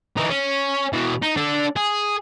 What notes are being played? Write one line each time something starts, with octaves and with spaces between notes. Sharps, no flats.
E3 D#4
C#4
B2 E3
D#4
D4 A4
G#4